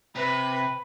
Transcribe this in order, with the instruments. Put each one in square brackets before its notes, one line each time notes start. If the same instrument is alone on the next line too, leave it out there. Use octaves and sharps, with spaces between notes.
[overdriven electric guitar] C3 [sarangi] B4